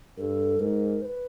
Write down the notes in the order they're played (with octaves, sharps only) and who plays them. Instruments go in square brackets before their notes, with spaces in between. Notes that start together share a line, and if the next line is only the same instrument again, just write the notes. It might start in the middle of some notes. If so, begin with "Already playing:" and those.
[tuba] G2 [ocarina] A4 A#4
[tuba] G#2 [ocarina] A#4
[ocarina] C5
B4